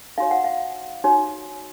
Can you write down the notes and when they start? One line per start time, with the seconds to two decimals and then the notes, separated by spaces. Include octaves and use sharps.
0.18 D#4 F#4 C#5 F5
0.31 F#5
0.44 F5
1.04 D#4 F#4 C#5